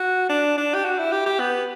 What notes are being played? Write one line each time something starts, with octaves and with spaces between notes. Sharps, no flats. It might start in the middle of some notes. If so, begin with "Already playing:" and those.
Already playing: F#4
D4
D4
G4
F#4
E4
G4
G4
B3